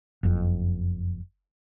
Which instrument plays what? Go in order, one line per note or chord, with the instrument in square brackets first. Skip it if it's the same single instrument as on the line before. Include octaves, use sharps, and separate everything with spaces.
[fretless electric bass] F#1 F2